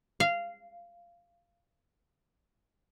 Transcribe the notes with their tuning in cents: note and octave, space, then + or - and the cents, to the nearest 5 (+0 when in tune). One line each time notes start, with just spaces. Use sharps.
F5 -15